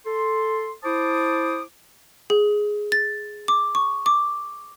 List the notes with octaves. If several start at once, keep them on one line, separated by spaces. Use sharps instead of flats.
A4 C6
E4 C5 A5 D6 D#6
G#4
A6
D6
C#6
D6